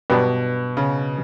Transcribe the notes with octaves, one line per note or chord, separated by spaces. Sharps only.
G2 B2 F#3 B3 D4
C#3